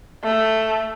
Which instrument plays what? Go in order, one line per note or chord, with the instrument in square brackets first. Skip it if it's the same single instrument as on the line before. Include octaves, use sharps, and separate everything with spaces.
[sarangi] A3